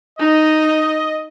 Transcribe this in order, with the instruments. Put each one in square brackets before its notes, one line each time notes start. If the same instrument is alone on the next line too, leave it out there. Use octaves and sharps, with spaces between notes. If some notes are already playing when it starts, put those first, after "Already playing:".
[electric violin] D#4 [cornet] D#5